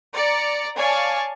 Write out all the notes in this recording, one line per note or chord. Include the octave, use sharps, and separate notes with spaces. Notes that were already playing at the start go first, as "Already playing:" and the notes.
D5 A#5 C#7
C#5 D5 F5 G#5 A5